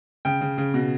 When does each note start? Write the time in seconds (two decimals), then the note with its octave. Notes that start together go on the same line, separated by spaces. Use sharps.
0.25 C#3 G5
0.41 C#3
0.58 C#3
0.74 B2